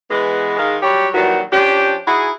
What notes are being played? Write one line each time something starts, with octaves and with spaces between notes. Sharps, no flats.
E3 G#3 B3
D#3 G#3 F5
F#3 G3 G4 C#5
A#2 D#3 E3 F#3 G3 F#4
F3 C#4 D4 G4
D#4 E4 F#4 G#4